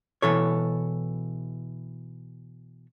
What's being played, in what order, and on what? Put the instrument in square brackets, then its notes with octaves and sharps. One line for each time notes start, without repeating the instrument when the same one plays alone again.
[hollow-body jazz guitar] B2 E3 A4 C#5